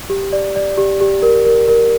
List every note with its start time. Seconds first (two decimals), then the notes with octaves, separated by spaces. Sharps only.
0.10 G4
0.33 D5
0.56 D5
0.77 G4
1.01 G4
1.22 A#4
1.46 A#4
1.68 A#4